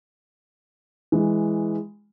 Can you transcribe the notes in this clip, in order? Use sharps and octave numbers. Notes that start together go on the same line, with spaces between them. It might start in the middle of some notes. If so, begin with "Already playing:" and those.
E3 G#3